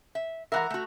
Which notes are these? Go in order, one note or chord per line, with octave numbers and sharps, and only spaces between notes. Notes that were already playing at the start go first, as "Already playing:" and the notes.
E5
E3 A#4 E5 F#5 A#5
A3 F#4